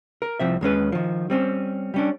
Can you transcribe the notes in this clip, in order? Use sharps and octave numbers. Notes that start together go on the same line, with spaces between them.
A#4
C2 F3 C4 E5
D#2 G#3 C#4 B4
D#3 F3
G3 C4 C#4
G3 C#4 D4